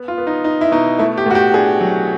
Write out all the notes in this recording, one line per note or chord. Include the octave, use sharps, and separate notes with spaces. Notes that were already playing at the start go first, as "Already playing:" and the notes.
Already playing: B3
F4
B3
D#4
D#4
E4
B2 D#4
A3 E4
G4
A2 F#4
G4
D4 G#4
F#3